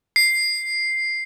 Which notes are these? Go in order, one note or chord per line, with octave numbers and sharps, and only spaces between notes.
C7